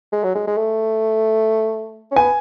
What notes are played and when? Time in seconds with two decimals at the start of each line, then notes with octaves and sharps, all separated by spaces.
0.12 G#3
0.24 F#3
0.35 G#3
0.47 G#3
0.58 A3
2.11 C#4
2.16 B3 G#5